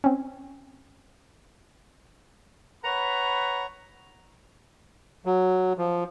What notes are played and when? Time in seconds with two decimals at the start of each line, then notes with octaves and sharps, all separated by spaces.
0.04 C4 C#4
2.84 B4 C#5 F#5 A#5 B5
5.26 F#3
5.78 F3